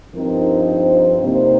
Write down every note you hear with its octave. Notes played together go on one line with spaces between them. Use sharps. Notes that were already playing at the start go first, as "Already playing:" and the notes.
G2 F3 C4 D#4 A#4
C5
C3 G3 A#3 D#4 C5